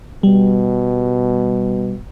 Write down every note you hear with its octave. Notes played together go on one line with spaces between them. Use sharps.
B2 G3